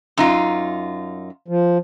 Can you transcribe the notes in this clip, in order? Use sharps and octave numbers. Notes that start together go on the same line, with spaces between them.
F#2 D#4 F4
F3